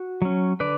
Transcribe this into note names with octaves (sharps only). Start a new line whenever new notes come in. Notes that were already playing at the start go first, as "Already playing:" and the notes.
Already playing: F#4
F#3 C#4
D3 B4 D5